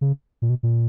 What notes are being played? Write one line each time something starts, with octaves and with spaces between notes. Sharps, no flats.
C#3
A#2
B2
A#2